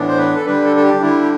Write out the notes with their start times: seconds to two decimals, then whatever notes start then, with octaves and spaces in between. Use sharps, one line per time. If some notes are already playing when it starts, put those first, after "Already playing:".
Already playing: A2 E3 B3 D4
0.08 C5
0.18 B4
0.36 A4
0.45 D3 G3 D4 B4
0.64 A4
0.76 A4
0.83 G4
1.00 D3 G3 D4 E4
1.22 G4